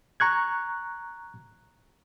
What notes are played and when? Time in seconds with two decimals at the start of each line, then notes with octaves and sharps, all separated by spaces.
0.20 A#5 C#6 F#6 G#6